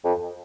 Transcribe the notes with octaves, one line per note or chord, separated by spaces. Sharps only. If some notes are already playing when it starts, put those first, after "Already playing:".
F2